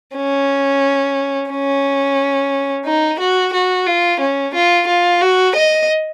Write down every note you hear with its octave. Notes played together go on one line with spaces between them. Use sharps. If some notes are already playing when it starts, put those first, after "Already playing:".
C#4
C#4
D#4
F#4
F#4
F4
C#4
F4
F4
F#4
D#5